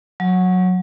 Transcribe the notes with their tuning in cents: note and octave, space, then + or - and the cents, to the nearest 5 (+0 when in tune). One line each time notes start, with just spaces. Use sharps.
F#3 -10